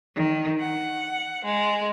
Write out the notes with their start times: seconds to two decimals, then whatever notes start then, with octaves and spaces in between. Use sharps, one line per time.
0.16 D#3
0.60 F#5
1.44 G#3